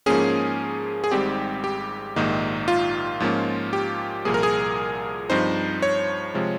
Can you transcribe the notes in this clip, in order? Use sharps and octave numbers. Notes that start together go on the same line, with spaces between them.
G#2 F3 A#3 C#4 G#4
G#4
G#1 G#2 G3 C4 G4
G4
A#1 G#2 D#3 A#3 D#4
F4
G#2 F3 A#3 C#4
G4
C2 A#2 F3 A#3 G#4
A#4
G#4
G2 F3 C4 D#4 C5
C#5
C3 F3 G#3